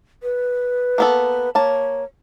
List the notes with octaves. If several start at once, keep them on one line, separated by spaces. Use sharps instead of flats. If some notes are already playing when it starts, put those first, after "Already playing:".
B4
A#3 B3 A4
A#3 C#5 A5